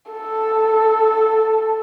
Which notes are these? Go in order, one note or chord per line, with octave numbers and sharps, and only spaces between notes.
A4